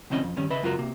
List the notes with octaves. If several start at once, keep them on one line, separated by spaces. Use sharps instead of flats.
C#2 B2 E3 C4 C#4 D#5
F2
G2 D#3 C#4
C#3 B4 D#5 E5 B5
C#2 F#2 F4 F#4 A#4
C3 A#3